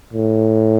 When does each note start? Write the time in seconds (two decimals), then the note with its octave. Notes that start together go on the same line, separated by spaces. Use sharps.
0.13 A2